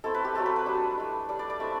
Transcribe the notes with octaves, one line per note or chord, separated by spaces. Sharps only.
A3 C4 E4 A4
B4
G4
F#3 A3 C4 A4
B4
B4
G3 D4
A3 E4
G3 D4 D5
D5
D5
A3 C4 E4 E5